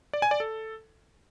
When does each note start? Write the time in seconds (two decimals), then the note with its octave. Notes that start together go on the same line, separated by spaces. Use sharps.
0.13 D5
0.22 G#5
0.31 D5
0.40 A4